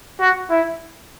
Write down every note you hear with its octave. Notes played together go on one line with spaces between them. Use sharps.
F#4
E4